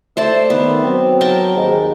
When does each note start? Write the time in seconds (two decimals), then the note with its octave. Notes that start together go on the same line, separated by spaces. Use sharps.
0.17 A3 C5 D5 E5 A5
0.50 D#3 B3
0.84 F#3 C4
1.21 A#4 G5 A5
1.56 D#2 G#2